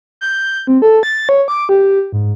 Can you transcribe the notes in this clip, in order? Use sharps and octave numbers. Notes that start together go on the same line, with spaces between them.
G6
C4
A4
A6
C#5
D6
G4
G#2